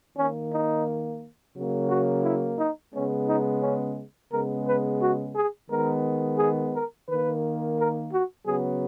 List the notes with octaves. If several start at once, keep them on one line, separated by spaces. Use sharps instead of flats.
D#3 A#3 C#4
D#4
C#3 F#3 A#3
F#4
E4
D#4
C#3 G#3 B3 C#4
D#4
C#4
C#3 G#3 B3 A#4
B4
F#4
G#4
D#3 G#3 B3 A#4
G#4
A#4
D#3 A#3 B4
A#4
F#4
C#3 F#3 B3 G#4